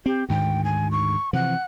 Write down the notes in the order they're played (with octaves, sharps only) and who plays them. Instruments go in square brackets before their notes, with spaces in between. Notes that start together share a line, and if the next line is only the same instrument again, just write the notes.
[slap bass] C4 [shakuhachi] G4
[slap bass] D2 G#2 D#3 [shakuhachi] G5
[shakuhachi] G#5
C#6
[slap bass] C3 E3 F3 [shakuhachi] F#5